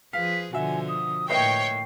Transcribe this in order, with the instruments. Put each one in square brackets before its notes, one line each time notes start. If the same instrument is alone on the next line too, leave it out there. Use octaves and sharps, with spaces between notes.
[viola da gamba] F3 G#4 B4 [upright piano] F5 [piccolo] B6
[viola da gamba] B2 D3 F3 [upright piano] F#4 E5 [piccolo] G#5
[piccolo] D#6
[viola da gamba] A2 A#3 [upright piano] B4 D#5 E5 [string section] C#5 G5 [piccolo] C7